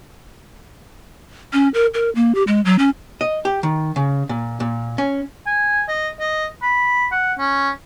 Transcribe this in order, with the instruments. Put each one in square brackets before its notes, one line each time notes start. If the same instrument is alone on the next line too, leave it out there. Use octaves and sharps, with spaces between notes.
[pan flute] C#4
A#4
A#4
A#3
G4
G#3
F#3
C#4
[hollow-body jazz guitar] D#5
G4
D#3
C#3
A#2
A#2
C#4
[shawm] G#5
D#5
D#5
B5
F#5
C#4